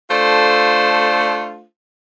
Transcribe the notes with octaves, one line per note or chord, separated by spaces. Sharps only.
A3 D4 F4 A4 C5